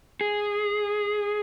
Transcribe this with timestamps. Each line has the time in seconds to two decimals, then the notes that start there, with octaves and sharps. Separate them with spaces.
0.21 G#4